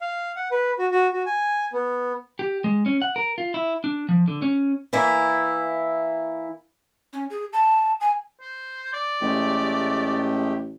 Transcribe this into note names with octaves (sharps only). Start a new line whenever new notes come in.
F5
F#5
B4
F#4
F#4
F#4
G#5
B3
G4
G#3
C#4
F#5
A#4
F4
E4
D4
F3
D3
C#4
E3 A#3 E4
C#4
G#4
A5
G#5
C5
D5
A1 G#3 A3 G4